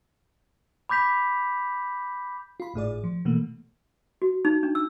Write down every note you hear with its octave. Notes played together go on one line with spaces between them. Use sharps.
B5 D6 G6 B6 F7
F4 B5
G#1 A2 G#4 D5
F3
B2 E3 A3 A#3
F#4
D#4
D4
E6